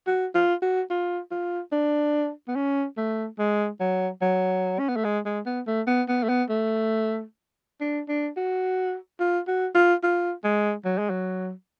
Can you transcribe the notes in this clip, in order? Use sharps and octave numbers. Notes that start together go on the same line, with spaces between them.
F#4
F4
F#4
F4
F4
D4
B3
C#4
A3
G#3
F#3
F#3
C#4
B3
A3
G#3
G#3
B3
A3
B3
B3
A3
B3
A3
D4
D4
F#4
F4
F#4
F4
F4
G#3
F#3
G#3
F#3